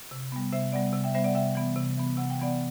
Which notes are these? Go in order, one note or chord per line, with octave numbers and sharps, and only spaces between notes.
C3
G3 B3
C3 C5 E5
G3 B3 D5 F#5
C3
E5 G5
G3 B3 C5 E5
D5 F#5
C3 E5 G5
E3 B3
C3
E3 B3
C3 F#5
G5
E3 B3 D5 F#5